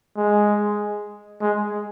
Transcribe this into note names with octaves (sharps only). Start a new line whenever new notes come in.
G#3
G#3